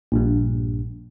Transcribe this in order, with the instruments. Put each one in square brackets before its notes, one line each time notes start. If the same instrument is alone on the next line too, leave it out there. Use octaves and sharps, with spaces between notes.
[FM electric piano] A#1 G2